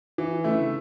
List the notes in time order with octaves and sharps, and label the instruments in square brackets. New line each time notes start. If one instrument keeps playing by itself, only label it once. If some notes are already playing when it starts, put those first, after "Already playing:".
[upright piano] E3
[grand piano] C#3 [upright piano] A3 E4
[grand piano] D3